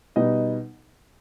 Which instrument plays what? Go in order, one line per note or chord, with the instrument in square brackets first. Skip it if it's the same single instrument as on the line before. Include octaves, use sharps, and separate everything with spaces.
[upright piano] B2 G3 B3 D#4 D#5